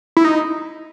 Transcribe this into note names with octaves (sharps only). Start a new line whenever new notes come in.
E4
D#4